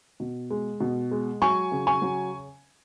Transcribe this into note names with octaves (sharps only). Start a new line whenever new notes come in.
B2
G#3
B2
G#3
F#3 G#5 C#6
C#3
G#5 C#6
F#3